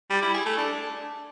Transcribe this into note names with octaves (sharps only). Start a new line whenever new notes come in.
G3
E4
G#4
A3
D4